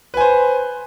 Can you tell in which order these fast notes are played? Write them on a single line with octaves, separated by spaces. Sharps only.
B4 G#5 C5